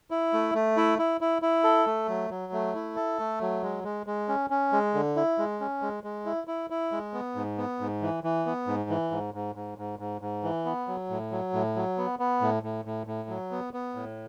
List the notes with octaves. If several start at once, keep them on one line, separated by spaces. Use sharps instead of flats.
E4
A3
A3
E4
E4
E4
E4
A4
A3
F#3
F#3
A3
E4
A4
A3
F#3
G#3
G#3
G#3
C#4
C#4
G#3
D3
E4
G#3
C#4
G#3
G#3
E4
E4
E4
G#3
B3
G#2
B3
G#2
E3
E3
B3
G#2
E3
G#2
G#2
G#2
G#2
G#2
G#2
E3
B3
F#3
A2
F#3
A2
F#3
B3
B3
A2
A2
A2
A2
F#3
B3
B3
A2